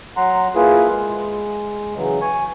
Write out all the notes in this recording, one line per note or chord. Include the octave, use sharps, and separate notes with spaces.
F#3 F#5 A#5 C6
A#3 E4 F4 G#4 B4
G#3
C#3 E3 F#3
G#5 C#6